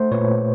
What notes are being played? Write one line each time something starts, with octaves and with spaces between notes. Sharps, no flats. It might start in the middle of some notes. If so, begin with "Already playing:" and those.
Already playing: A3 C5
A#2 B4 C#5